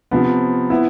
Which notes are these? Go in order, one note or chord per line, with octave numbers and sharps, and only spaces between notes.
C3 F3 B3
B3 E4